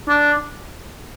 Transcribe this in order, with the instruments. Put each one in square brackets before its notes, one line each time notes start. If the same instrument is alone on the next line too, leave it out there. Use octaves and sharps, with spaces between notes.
[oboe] D4